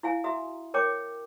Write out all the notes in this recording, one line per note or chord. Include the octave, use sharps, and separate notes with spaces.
E4 F5 G#5
F#4 E5 A#5 D#6
A#4 C#5 G5 D6